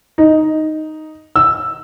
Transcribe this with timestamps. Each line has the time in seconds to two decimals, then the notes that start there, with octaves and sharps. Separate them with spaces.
0.18 D#4
1.36 E6